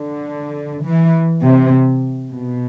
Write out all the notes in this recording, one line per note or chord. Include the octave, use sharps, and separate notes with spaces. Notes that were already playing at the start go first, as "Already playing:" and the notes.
Already playing: D3
E3
C3
B2